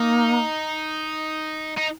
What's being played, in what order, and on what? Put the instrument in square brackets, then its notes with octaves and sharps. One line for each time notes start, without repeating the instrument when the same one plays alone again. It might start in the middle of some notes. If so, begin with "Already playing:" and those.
Already playing: [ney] A#3 [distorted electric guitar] D#4
[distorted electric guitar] D#4